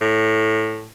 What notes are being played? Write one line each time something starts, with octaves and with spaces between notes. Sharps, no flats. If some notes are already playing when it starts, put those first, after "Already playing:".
A2